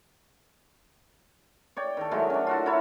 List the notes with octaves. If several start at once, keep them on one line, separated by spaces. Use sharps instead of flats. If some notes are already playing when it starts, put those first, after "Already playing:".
C#5 D5 G5
D#3 A4
D#3 F#3 G#3 A3
C#4 D4
F4 F#4 A4
E4 A4 A#4 C#5